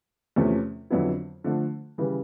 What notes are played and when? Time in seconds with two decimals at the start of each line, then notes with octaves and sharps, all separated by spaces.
0.36 E2 C3 F3 A3 C#4
0.90 F2 D3 F#3 B3 E4
1.44 D3 F3 A3
1.98 C#3 E3 G3